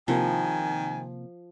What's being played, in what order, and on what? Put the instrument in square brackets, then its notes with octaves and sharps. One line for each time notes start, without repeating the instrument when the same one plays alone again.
[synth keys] C3 A#3 [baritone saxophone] D#3 [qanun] F3 [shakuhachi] G#5